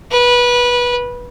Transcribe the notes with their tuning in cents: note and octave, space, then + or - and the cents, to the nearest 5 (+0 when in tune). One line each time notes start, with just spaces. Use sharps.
B4 -20